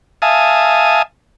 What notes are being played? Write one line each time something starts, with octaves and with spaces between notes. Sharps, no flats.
E5 F5 G#5 A5 D#6